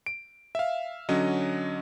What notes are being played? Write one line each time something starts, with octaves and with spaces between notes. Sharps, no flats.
D7
E5 F5
D3 F#3 C#4 D#5